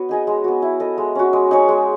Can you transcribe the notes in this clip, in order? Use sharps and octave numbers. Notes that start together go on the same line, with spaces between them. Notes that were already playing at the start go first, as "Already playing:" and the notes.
Already playing: B3 F#4 B4 C#5
D#4 G#4 D#5
G#3
B3 F#4
E4
A4 D#5
G#3
C#4 F#4
G#3
D#4 G#4 C#5
G#3